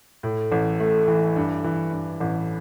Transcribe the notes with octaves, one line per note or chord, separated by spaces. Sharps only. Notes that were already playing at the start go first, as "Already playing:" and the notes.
A2
A1
A3
E3
G2
E3
G2
A1